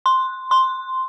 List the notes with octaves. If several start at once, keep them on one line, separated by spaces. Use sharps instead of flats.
C6
C6